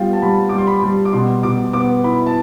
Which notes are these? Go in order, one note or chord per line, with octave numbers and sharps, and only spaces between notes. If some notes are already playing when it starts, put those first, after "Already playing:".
Already playing: G3 B3 F4 G5
A5
G3 B5
G3 D6
C6
B5
G3
D6
B2 C6
B2 D6
B3 D6
E4 B5
A5